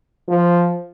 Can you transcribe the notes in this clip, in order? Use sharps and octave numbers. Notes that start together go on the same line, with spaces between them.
F3